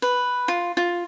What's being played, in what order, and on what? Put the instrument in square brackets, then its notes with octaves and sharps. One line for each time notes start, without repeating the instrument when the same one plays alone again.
[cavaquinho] B4
F4
F4